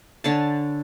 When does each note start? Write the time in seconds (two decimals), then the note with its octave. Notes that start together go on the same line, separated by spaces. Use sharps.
0.24 D3 C#5 G#5 A5